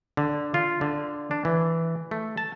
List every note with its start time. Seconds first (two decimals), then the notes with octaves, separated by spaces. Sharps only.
0.17 D3
0.54 F4
0.81 D3
1.31 D4
1.45 E3
2.11 A3
2.37 A5